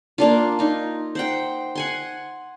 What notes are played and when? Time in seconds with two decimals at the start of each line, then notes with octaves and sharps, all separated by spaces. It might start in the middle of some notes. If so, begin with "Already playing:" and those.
0.18 A#3 D4 F4
0.59 D#4 F4
1.15 C5 F#5 G5
1.75 F#5 G#5 C6